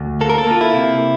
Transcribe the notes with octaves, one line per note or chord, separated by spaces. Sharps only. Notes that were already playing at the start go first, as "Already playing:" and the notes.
Already playing: D2
A#3 A4
A#4
A4
A#3 F4
E4
C3